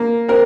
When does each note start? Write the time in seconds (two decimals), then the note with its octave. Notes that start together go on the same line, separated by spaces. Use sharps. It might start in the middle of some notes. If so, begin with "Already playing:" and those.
Already playing: A#3
0.28 C4 A#4